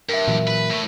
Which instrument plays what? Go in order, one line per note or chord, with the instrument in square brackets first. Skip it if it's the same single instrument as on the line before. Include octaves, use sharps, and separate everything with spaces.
[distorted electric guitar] G2 [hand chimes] A#4 E5
[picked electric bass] A#2 E3 F#3
[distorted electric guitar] B4
A2 A3